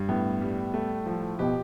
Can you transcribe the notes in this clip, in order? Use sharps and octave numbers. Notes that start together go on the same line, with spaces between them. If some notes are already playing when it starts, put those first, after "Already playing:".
Already playing: G2
A2 B3
G3
A3
F3
B2 G4